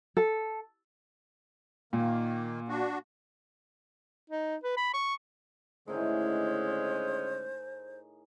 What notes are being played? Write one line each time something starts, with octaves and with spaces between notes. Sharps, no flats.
A4
A#2 D#3 A#3
D4 F#4
D#4
B4
B5
C#6
A2 D3 D#3 G#3 C#4 G#4 C5